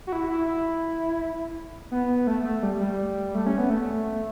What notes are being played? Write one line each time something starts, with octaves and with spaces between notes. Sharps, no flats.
F#4
E4
E4
E4
B3
A3
A3
G3
G3
A3
C#4
B3
A3